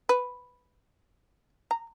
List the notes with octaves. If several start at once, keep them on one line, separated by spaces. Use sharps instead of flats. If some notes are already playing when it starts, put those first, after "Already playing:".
B4
A#5